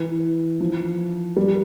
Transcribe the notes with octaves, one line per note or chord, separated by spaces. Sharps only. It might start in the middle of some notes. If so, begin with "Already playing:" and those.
Already playing: E3
F3
G3